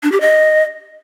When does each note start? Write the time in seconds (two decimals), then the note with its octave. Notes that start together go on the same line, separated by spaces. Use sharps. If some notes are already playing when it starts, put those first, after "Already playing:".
0.03 D4
0.12 G4
0.21 D#5